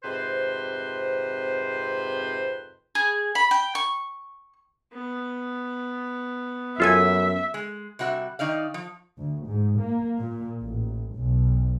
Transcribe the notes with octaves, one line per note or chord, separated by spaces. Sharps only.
F2 G#2 C3 B4 C5
G#4
B5
G5
C#6
B3
F#2 F4 A4 E5 G#5
G#3
C3 G3 F#4 C#5 E5
D#3 D#4 D5 F5
F3
D2
G#2
A#3
A#2
A1
B1